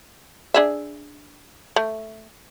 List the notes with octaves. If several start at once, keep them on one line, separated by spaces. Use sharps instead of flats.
D4 G#4 E5
A3